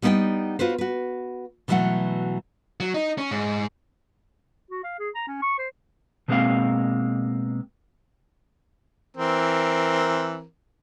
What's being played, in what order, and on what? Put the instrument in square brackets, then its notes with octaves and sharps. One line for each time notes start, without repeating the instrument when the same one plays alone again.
[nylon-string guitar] G3 B3 D#4 E4 D5 G5
F4 F#4 B4 C5
F#4 B4
B2 D#3 E3 F#3 A3 F#5
[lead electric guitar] F#3
D#4
C#4
G#2
[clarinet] F#4
F5
G#4
A#5
C#4
C#6
C5
[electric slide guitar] B2 F3 G#3 A#3 C4 F5
[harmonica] E3 C4 A#4